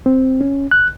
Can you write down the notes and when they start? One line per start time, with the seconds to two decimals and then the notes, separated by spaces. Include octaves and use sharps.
0.06 C4
0.41 C#4
0.71 F#6